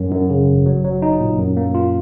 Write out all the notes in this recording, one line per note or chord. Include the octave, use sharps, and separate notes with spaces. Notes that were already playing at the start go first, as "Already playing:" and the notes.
Already playing: F#2
F#2
C#3
G#1
F#3
F#3
D#4
A#2
F#2
A#3
F4